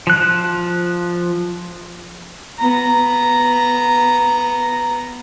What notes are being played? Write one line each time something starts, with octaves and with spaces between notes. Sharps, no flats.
F3 F#6
B3 A#5